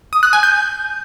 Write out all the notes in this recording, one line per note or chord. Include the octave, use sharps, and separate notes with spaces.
D#6
F#6
G#5
G6